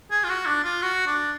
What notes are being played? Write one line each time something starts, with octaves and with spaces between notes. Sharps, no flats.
G#4
F4
F#4
D4
F4
F#4
D4